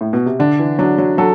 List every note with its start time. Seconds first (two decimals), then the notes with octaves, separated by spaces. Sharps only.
0.01 A2
0.13 B2
0.26 C3
0.39 D3 D4
0.59 E3
0.79 F#3 D4
0.98 F#3
1.18 F#3 A4